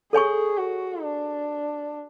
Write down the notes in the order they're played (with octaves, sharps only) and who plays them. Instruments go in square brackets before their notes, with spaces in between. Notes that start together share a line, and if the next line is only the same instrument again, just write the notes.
[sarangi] G#4 [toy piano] A4 C#5 G#5 C#6
[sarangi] F#4
D4